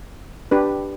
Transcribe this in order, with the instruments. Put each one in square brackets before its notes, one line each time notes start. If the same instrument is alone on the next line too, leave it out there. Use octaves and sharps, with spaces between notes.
[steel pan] D4 G4 B4